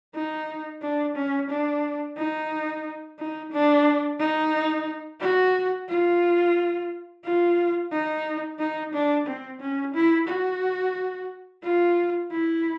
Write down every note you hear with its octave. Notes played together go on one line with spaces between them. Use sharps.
D#4
D4
C#4
D4
D#4
D#4
D4
D#4
F#4
F4
F4
D#4
D#4
D4
C4
C#4
E4
F#4
F4
E4